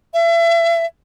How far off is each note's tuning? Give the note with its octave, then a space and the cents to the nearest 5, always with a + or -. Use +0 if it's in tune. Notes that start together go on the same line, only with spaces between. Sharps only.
E5 +35